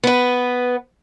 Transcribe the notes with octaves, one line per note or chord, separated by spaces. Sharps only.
B3 B4